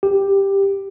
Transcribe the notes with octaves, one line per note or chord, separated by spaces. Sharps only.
G4